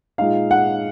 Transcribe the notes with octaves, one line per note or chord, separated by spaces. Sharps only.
A#2 G#3 D#4 F5
F#5